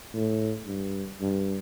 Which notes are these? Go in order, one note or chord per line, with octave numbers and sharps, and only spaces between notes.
A2
G2
G2